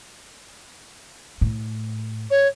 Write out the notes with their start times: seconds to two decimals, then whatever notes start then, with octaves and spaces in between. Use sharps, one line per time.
1.41 A2
2.31 C#5